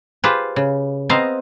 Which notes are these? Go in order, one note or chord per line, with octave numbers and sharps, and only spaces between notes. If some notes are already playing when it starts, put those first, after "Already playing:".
F4 G4 G#4 B4 C5
C#3
B3 C4 C5 D#5 F5 A#5